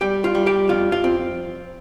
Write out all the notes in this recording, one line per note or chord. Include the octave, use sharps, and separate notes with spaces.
G3 G4 G5
F4 F5
G3
G4 G5
F2 F4 F5
F4 F5
C4